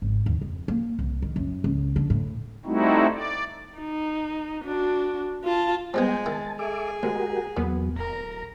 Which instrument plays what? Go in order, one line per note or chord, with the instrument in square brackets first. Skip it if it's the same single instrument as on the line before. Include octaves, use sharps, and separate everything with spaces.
[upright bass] G#1
D#2
F2
A#3
C2
D#3
F#2
C#2
D3
A2
[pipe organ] G3 A3 C4 D#4 E4 F#4
D5
[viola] D#4
D4 F#4
F4 A5
[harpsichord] F3 G3 B3 [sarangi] G#3 [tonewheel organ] G5 G#5
[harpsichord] D#3 E4 [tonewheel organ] A5
[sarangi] G#4 [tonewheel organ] A4 E5 D6
[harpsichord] D2 [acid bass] G#3 [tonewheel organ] F#4 G4 A#4
[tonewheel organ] E2 F#3 [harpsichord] A#2 [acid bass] B3
[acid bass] D1 [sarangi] A#4 [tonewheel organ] A#5